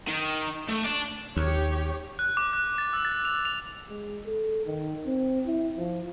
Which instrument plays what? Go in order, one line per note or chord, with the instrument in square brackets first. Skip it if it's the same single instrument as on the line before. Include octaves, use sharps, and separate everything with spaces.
[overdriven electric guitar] D#3
A3
D5 A5
[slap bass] D#2 [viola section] G4 C#5
[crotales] F#6
D6
F#6
A6
E6
A6
F7
F7
[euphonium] G#3
A4
D#3
C4
E4
F3